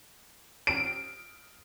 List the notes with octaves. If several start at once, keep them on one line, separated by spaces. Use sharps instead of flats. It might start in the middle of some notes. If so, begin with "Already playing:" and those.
D7